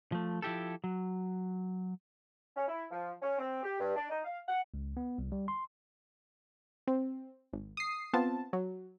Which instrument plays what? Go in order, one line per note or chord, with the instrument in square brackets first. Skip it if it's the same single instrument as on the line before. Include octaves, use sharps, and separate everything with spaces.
[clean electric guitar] F3 A3
F3 E4 G4 A4
F#3
[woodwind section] C#4
E4
F3
C#4
C4
G4
G2
D4
D#4
F5
F#5
[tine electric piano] C#2
B3
C2
G3
C6
[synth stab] C4
G#1
D#6 C7
B3 C4 F4 A5
F#3